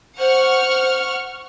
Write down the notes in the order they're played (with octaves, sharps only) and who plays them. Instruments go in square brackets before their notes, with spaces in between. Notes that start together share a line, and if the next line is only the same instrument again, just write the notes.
[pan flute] C5 [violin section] F#5 C#6 F6